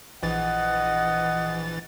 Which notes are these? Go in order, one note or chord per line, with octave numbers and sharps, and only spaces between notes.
A#1 E3 D#5 F#5 A6